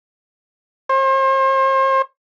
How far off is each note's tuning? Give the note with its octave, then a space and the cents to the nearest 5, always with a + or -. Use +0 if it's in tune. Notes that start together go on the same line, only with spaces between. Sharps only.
C5 +40